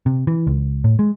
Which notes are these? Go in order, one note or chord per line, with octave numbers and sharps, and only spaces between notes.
C3
E3
C#2
A2
G#3